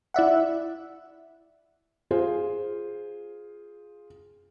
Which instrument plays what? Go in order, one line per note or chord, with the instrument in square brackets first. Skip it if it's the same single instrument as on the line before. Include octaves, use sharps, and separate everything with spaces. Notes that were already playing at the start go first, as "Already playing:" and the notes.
[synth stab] E4 D5 E5 F#5
[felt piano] F4 G#4 C5